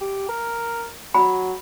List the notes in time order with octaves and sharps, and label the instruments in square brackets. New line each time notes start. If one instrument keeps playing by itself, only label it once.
[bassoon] G4
A#4
[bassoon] F#3 [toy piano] B5